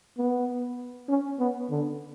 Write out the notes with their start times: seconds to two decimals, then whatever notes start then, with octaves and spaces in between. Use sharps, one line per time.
0.18 B3
1.09 C#4
1.39 B3
1.70 D3